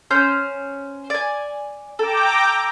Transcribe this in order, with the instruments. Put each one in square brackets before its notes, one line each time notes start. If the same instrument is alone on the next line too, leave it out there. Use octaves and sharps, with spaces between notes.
[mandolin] C#4 C5 G6
D5 G#5
[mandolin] A4 [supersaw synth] G5 A#5 D6